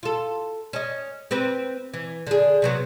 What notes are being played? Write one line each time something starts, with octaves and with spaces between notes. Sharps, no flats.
F4 A4
C#4 D#5
C4 G4 B4
E3
D3 G#4
C3 F#3 B3